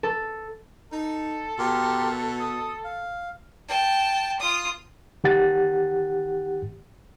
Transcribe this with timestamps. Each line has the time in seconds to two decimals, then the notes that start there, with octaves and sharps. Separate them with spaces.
0.03 A4
0.92 D#4 A4
1.59 B2 G4 A#4 C6
2.40 D#6
2.84 F5
3.68 G5 A5
4.40 F4 D#6
5.24 D#3 G4 F#5 A6